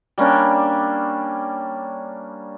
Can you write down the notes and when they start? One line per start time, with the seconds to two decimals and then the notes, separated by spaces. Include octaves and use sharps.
0.18 G3 A#3 C#4 D4